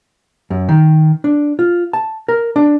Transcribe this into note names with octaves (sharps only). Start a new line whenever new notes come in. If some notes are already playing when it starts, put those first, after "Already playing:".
F#2
D#3
D4
F4
A5
A#4
D4